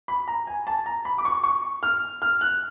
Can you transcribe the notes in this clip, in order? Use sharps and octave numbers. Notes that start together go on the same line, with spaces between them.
B5
A#5
G#5
A5
A#5
B5
D6
C#6
C#6
F6
F6
F#6